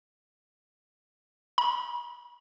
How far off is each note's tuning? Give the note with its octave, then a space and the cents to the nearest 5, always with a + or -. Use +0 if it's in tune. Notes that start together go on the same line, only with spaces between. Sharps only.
B5 -40